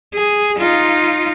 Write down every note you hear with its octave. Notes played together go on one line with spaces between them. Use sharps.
G#4
D#4 F4